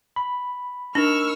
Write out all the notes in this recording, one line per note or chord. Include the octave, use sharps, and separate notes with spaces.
B5
D4 D#4 A#4 C#6 E6 F6